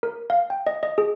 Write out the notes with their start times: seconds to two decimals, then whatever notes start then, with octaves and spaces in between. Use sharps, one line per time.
0.03 A#4
0.30 F5
0.50 G5
0.67 D#5
0.83 D#5
0.98 G#4